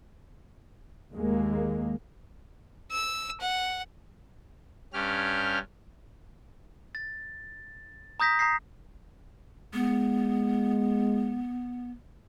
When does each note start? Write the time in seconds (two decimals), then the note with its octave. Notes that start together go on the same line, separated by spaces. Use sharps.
1.13 D#2 G#3 A#3
2.91 E6
3.40 F#5
4.93 G2 C#4 G4 F6
6.95 A6
8.20 A#5 D#6 G6 A#6 B6
8.39 A#5 D#6 G6 A#6 C7
9.74 G#3 B3